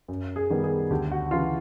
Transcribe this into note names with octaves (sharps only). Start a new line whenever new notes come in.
F#2
G#4
D#3 G3 B3
G#4
D2 G4
F#4
C#3 E3 F4